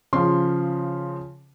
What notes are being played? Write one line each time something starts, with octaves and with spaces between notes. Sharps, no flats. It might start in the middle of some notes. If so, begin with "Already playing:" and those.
C#3 F3 C6